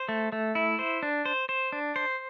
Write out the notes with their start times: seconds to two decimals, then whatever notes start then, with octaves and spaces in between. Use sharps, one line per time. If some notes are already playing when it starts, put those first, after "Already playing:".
Already playing: C5
0.09 A3
0.32 A3
0.55 E4
0.79 C5
1.03 D4
1.26 C5
1.49 C5
1.72 D4
1.96 C5